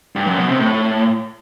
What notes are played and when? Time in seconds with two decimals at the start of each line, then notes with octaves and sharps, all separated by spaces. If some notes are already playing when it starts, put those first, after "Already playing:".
0.16 G2
0.27 F#2
0.38 B2
0.49 C3
0.60 A2